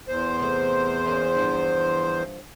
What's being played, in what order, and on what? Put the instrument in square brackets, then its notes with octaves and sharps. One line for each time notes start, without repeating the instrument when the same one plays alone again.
[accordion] E2 C5
[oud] C3 A3
E3 A#3 C#4
G2 E3 F3